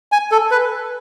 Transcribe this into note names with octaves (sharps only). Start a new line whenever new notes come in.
G#5
A4
B4